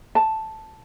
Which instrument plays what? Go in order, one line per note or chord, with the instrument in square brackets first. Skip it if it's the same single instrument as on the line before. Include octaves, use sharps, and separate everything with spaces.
[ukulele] A5